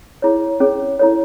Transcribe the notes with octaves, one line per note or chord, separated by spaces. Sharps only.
E4 G#4 C#5
C#4 G#4 C#5
E4 A4 C#5